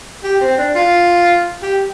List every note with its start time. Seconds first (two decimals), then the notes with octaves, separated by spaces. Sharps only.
0.24 G4
0.41 C4
0.58 D4
0.76 F4
1.63 G4